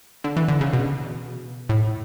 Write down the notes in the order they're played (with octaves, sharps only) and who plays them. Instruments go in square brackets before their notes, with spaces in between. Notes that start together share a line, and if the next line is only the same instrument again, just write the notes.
[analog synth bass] D3
E3
D3
C#3
B2
A2